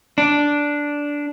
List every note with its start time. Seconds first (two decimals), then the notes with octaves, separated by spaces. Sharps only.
0.18 D4